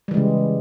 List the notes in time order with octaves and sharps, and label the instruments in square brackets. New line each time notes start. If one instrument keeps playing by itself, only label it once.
[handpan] G3
E3
G#3
C#3